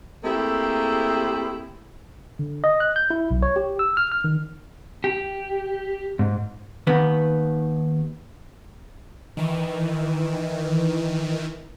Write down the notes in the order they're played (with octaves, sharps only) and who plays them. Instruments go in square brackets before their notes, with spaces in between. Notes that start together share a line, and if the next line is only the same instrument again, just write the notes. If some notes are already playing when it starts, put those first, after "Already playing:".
[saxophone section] A3 A#3 C4 E4 G4 G#4
[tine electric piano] D3
D#5
F#6
G6
E4
B1
C#5
G4
E6
F6
F6
D#3
[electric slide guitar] G4
G#2
[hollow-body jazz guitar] D#2 D#3 B3
[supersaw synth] D#3 E3